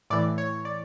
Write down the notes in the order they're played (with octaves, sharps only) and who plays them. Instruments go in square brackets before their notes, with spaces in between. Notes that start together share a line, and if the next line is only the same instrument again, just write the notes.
[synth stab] A2 E3 D5
C#5
D5